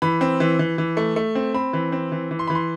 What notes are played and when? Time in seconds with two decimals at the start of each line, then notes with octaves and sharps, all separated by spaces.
0.02 E3 B5
0.21 C4
0.40 E3
0.59 E3
0.78 E3
0.97 A3
1.16 A3
1.35 C4
1.54 C4 B5
1.73 E3
1.92 C4
2.12 E3
2.31 E3
2.39 C6
2.48 E3 B5
2.55 C6